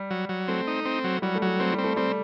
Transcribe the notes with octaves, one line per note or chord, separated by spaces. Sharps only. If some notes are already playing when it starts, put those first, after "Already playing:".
Already playing: G3
F#3
F#3
A3 C4
D#4
C4
F#3
F#3 G3
A3
F#3 G3
A3 C4
G3
C4
A3
G3 C4